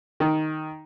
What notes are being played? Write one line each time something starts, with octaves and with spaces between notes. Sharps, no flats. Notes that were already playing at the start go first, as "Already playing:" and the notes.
D#3